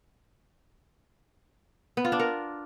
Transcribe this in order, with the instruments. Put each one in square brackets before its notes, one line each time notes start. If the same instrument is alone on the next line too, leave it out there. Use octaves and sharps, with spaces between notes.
[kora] B3
F4
D4
A#4